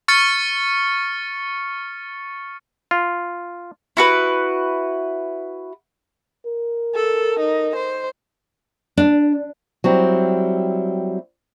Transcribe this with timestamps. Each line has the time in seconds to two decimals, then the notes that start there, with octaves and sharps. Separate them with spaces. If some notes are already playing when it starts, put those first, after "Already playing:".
0.08 C#6 F6 A6 C#7
2.91 F4
3.97 E4 F#4 B4
6.46 A#4
6.95 A4
7.39 D#4
7.75 C5
8.97 D4
9.84 F#3 G3 C4 E4